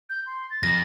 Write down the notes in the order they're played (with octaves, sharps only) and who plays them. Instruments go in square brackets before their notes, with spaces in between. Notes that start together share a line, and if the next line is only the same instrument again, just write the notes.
[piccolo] G6
C6
A6
[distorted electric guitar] F2 [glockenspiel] A#6